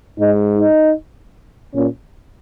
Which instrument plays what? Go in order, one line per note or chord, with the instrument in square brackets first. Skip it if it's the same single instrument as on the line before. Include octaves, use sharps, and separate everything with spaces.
[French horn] G#2 [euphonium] D#4
[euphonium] D#4
[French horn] A#2 [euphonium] C#4